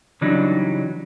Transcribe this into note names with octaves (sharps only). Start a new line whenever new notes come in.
C#3 E3 F#3 G3 D4 D#4